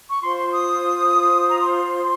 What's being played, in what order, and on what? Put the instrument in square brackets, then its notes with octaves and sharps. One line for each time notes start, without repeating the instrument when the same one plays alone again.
[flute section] C#6
F4 C5 C6
C6
D#6
F4 C5
A#5
C6